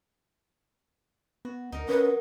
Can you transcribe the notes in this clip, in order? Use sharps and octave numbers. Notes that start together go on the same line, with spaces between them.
B3 F#4
D2 D#4 A#4
F#3 C#4 D#4 B4